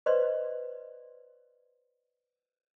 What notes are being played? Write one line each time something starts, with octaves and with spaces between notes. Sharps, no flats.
B4 C5 D5 D#5 C6